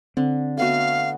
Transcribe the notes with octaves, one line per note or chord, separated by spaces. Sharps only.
D3 C4
A3 B3 F#4 F5